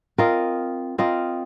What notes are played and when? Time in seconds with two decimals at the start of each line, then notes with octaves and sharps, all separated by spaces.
0.18 C4 F4 A#4 D#5
0.98 C4 F4 A#4 D#5